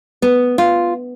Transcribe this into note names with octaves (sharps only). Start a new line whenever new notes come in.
B3
F4